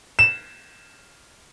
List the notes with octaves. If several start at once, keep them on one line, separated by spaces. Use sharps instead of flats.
E7